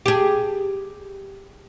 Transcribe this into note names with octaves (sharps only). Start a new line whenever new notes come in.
G4 G#4